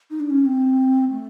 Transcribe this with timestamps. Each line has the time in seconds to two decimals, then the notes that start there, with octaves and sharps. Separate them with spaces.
0.11 D#4
0.20 D4
0.30 C#4
0.41 C#4
0.45 C4
1.11 A3